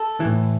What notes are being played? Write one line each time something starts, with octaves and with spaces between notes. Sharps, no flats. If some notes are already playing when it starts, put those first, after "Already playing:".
Already playing: A4
A2 E3